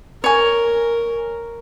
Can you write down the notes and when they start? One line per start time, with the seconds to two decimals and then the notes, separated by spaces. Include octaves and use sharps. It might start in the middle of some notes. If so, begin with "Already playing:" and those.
0.24 A#4 C#5 G#5